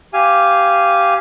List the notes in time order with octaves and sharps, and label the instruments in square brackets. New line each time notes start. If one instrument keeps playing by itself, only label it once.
[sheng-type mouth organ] G4 F5 G#5